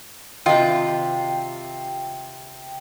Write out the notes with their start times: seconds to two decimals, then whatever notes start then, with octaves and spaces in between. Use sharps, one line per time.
0.46 C3 D#3 F4 F#4 D#5 G5